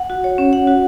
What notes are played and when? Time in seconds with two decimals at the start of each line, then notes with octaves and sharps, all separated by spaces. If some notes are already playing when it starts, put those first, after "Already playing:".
Already playing: F#5
0.10 F#4
0.24 C#5
0.38 C#4
0.53 F#5
0.67 F#4